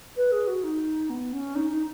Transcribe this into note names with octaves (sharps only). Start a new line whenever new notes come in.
B4
G#4
F#4
D#4
B3
C#4
D#4
D#4